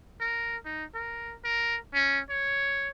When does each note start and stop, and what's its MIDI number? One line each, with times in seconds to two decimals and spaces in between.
0.21 0.56 70
0.65 0.84 63
0.95 1.35 70
1.45 1.77 70
1.94 2.20 61
2.30 2.89 73